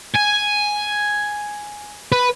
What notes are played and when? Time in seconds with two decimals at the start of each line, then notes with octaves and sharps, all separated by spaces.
0.15 G#5
2.12 B4